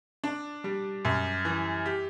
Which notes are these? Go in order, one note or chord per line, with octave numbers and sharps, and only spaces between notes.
D4
G3
F#2
E3
G4